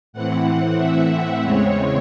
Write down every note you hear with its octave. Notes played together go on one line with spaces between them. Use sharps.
A2 E3 C4 F#5
F#5
E5
E5
E2 C#3 G#3 C4 C#5